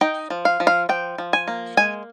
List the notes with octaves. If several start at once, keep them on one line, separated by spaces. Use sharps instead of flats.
D#4 G5
F3
F5
F3
F5
F3 G5
F3
G#5
A#3
G#3 G#5